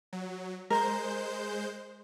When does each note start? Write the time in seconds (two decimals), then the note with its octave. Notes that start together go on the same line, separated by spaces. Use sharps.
0.13 F#3
0.70 G#3 A#4 C5 G6